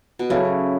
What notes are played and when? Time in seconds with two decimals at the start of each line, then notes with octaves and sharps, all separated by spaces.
0.19 B2
0.30 C#3 F#3 C#4 E4 A4